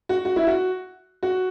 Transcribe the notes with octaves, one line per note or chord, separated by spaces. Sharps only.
F#4
F#4
E4
F#4
F#4